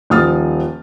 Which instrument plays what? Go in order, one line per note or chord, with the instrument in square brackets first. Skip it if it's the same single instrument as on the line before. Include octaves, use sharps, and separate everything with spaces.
[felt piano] D#1 F3 D#6 F6 A6